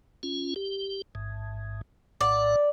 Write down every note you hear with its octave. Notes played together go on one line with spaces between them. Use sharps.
C#4 F4
G4
A1 G#2
A#1 A2 D5 F#5